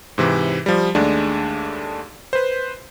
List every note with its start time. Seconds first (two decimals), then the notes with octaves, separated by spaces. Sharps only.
0.18 G#2 C3 E3
0.66 F3 G3
0.95 D#2 G#3 A3 D4
2.33 B4 C5